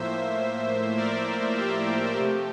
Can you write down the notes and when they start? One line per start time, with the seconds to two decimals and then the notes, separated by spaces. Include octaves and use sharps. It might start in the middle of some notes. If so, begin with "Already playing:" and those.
Already playing: A2 F3 A#3 C5 E5
0.96 A#4 D5
1.57 G4
2.18 C3 F3 A3 C4